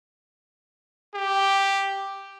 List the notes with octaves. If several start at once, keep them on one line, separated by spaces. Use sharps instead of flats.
G4